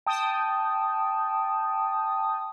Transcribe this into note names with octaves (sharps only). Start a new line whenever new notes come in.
G5 A5 D#6